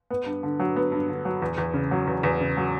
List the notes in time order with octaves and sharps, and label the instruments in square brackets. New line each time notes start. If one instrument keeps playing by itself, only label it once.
[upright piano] B3
G2
D3
F#3
B3
G2
D3
F#3
E2
E2
C#3
F#3
E2
E2
C#3
F#3